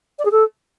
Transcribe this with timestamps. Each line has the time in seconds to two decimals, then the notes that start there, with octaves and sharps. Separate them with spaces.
0.18 D5
0.25 G#4
0.31 A4